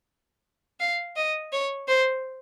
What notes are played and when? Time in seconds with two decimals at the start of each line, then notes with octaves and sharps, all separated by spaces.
0.80 F5
1.16 D#5
1.52 C#5
1.88 C5